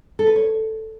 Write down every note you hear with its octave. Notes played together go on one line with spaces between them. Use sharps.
A4
B4
C#5